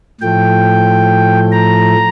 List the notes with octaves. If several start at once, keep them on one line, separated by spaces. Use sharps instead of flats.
A2 F3 A3 G5
A#5